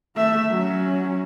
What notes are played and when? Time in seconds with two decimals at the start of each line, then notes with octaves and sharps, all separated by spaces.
0.16 A3 E5
0.51 F#3 C#4